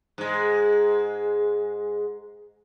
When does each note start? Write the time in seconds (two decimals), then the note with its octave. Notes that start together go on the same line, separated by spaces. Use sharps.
0.18 G#2 G#3